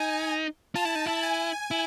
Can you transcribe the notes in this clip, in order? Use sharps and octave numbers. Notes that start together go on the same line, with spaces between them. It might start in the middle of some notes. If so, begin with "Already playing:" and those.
Already playing: D#4 G#5
F4 A5
E4
D#4
E4
G#5
E4